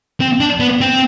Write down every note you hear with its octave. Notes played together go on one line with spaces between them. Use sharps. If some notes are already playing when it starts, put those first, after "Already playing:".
C4
D4
B3
C4